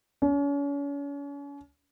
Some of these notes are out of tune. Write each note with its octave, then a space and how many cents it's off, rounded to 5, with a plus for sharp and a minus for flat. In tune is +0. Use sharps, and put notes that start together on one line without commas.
C#4 +40